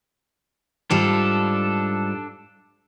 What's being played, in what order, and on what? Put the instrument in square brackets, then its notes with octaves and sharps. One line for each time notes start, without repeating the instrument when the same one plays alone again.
[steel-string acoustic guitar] G#2 G3 F4 [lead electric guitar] D4 A4